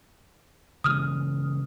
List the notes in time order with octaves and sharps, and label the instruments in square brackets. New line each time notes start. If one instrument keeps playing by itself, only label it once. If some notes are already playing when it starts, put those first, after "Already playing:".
[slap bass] C#3 E3 G#3 [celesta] D#6 F6